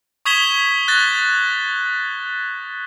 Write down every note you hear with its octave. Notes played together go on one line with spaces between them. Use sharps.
C#6 D#6 G#6 B6 E7 G7
F#6 G6 A6 A#6